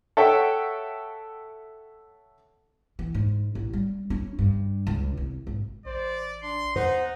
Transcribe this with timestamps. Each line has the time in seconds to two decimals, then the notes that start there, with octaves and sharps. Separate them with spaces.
0.17 A4 C#5 E5 F#5 G5
2.99 E3
3.15 G#2
3.55 A1
3.73 G3
4.10 C#4
4.39 G2
4.87 C#2
5.17 C2
5.47 G#1
5.86 A1 C5 D5
6.43 D4 C6
6.76 E2 D#4 C5 F#5